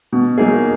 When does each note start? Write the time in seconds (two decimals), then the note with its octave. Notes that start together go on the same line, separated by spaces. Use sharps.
0.13 B2
0.38 F#3 A#3 D#4 G#4